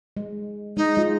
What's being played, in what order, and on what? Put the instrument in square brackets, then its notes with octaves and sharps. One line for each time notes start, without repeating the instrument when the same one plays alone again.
[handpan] G#3
[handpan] G#3 [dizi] D#4
[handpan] G#3 F4